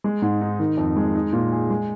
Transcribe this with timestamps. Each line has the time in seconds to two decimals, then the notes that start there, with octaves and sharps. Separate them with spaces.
0.04 G#3
0.22 G#2
0.41 D#4
0.59 D#3
0.77 F2
0.96 G#3
1.15 D#4
1.33 A#2
1.52 G#4
1.70 G#3